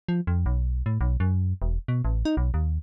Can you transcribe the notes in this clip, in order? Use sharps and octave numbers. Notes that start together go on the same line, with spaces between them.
F3
F2
B1
A2
B1
F#2
E1
B2
A1
D#4
B1
D#2